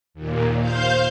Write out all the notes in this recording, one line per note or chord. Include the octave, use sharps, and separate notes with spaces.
D#2 A#2
C5 F5 G6